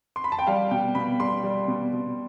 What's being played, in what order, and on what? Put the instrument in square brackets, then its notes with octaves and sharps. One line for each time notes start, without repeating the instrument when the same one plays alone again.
[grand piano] C6
B5
A5
G5
G3 F5
B2 G5
B2 B5
G3 C6
G3
B2
B2